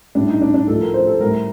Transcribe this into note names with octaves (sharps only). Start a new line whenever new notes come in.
A2 G3 D4
D#4
D4
D4
A2 F3 A4
A#4
C5
A4
A2 G3 A#4